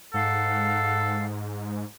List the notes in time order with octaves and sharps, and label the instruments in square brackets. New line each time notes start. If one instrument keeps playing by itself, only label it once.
[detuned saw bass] G#2 [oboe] A4 [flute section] F5 F#5